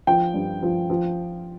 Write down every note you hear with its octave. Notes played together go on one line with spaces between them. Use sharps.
F3 G5
G2
F3
F3